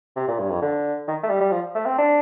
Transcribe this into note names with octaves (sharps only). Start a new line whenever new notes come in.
C3
A#2
G2
F2
D3
D#3
A3
G3
G3
F3
A3
C4
D4